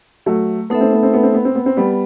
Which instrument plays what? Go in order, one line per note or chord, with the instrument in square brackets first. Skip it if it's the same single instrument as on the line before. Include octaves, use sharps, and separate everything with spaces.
[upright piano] F#3 A3
[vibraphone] A3 D#4 A4 E5 [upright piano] B3
[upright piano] C4
B3
C4
B3
C4
B3
C4
B3
C4
G3 B3